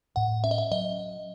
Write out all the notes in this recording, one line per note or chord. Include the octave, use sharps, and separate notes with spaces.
A2 F#5
C#4 E5
D#5
E5
F#3 D#5